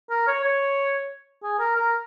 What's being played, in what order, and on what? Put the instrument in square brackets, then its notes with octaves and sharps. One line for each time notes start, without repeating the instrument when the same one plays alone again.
[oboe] A#4
C#5
C#5
G#4
A#4
A#4